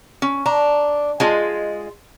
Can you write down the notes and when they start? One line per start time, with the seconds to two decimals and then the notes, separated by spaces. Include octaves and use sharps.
0.22 C#4
0.46 D4 A#5
1.20 G#3 F4 D#5 G#5